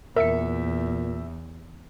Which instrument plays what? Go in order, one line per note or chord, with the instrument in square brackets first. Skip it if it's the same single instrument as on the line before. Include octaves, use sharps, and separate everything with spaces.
[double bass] E2 [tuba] A#2 [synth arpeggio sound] A#4 C#7 [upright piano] E5